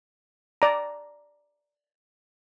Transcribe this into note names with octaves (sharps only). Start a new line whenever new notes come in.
D5 A#5